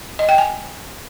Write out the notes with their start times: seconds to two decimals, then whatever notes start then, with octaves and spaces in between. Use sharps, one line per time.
0.19 D#5
0.29 G5
0.38 G#5